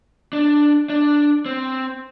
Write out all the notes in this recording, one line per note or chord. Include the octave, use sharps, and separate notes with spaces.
D4
D4
C4